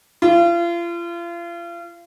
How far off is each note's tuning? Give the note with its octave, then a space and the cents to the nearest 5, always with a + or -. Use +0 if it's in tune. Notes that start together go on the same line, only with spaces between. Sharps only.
F4 -35